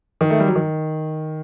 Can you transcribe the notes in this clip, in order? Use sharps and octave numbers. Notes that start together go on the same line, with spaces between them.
D#3
A3
G3
F#3
D#3